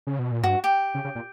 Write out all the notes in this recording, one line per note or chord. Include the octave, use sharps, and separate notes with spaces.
C#3
B2
A#2
G2 F#4
G4
C#3
C#3
A#2